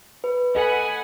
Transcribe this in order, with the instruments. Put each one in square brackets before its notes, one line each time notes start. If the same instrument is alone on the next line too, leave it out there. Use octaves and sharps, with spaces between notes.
[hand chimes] B4
[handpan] A4 D#5 [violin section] F#5 G#5 B5